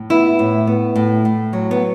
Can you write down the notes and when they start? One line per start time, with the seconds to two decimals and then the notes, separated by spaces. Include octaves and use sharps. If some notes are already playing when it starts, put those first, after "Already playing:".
Already playing: A2
0.10 B3 E4
0.39 A2
0.67 B3
0.95 A2
1.25 A2
1.53 F#3
1.71 B3